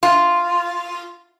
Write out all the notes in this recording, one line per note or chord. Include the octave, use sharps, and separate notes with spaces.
F4